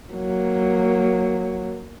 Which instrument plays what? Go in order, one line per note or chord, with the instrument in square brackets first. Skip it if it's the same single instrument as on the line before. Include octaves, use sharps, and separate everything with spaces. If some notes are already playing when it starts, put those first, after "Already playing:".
[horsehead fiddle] F#3 A#3